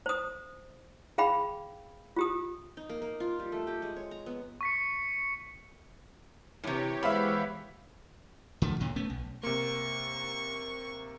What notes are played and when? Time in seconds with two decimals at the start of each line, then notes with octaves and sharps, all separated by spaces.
0.06 C5 D#6
1.18 G#4 F5 G5 B5
2.16 F4 G4 D#6
2.77 D#4
2.89 A#3
3.02 A#3
3.20 F4
3.39 G3
3.52 A3
3.67 G4
3.82 G#3
3.96 C#5
4.11 A#5
4.26 B3
4.61 C#6 B6 C#7
6.64 A2 C3 E3 G4 C#5
7.03 G#3 B3 G#4 C5 E5 F5 B5
8.62 D3 F3 A3
8.80 D#2 A#2 D3
8.96 A3 B3 C#4
9.10 B1
9.43 C3 A#3 C#6